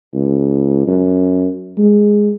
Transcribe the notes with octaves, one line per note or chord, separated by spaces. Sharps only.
C#2
F#2
G#3